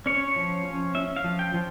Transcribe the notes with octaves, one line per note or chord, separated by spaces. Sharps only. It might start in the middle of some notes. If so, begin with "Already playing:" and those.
C#4 C#5
F3
C#4
C#4 E5
F5
F3
G5
F3